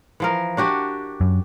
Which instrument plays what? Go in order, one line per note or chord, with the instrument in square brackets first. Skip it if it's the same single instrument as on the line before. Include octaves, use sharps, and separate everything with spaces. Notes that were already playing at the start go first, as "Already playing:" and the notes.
[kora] E3 F3 A#4
D4 F#4 G4
[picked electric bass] F#2